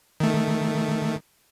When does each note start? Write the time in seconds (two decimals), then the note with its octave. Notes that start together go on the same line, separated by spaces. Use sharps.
0.20 D#3 A3